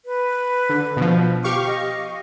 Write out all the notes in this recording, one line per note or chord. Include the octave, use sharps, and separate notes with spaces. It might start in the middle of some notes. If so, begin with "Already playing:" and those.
B4
D3
B2 F3
G4 F5 C#6 D6
D#5